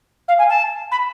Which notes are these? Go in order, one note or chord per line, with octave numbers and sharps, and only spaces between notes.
F5
G#5
A5
B5